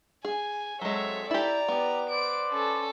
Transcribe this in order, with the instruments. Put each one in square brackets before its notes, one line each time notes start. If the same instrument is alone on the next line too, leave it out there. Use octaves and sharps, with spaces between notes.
[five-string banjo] G#4 [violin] G#5
[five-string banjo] F#3 G#3 [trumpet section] C4 A4 [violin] C#5 E5
[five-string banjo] E4 G4 [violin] D5 A#5
[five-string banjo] B3 [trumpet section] E4 G4
[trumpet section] B4 C5 D5 [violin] D7
[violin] C#4 A4